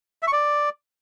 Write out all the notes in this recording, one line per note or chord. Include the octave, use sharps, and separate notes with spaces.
E5
C#6
D5